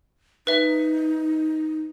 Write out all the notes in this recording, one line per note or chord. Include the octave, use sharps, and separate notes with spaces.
D#4 B4 E5